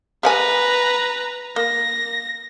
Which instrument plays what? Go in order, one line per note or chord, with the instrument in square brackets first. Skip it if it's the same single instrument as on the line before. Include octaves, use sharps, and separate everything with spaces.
[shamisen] G4 F#5 G#5 [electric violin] B4 A#5
[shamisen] A#3 [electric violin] A#6